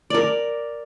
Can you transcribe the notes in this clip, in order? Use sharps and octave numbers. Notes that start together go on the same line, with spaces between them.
A#4 D5